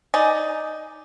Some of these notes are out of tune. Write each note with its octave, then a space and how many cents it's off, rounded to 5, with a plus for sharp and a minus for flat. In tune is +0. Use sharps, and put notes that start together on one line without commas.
D#4 +0 D5 +5 G#5 +15